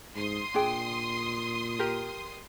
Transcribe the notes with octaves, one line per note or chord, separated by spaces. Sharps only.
G#2 C6 D#6
A#2 D4 G#4 G5
G4 A#4